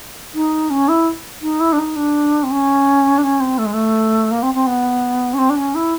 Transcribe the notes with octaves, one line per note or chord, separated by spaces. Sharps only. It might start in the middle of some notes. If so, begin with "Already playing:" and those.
D#4
C#4
E4
D#4
E4
D4
D#4
D4
C4
C#4
D4
C#4
C4
A3
G#3
A3
A#3
C4
C4
B3
C#4
C4
D4
C#4
E4